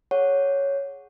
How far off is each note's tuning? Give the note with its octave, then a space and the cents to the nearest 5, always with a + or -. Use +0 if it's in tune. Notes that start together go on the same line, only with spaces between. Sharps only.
G#4 +0 C#5 +0 F#5 -10